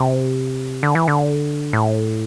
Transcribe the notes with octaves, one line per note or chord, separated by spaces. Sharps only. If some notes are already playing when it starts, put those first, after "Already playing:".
Already playing: C3
D3
E3
D3
A2